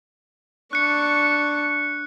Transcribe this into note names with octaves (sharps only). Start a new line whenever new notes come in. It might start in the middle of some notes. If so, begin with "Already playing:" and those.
D4 C#6 F#6 C#7